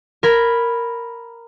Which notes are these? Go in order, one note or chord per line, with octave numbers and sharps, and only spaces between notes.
A#4 B5 G#6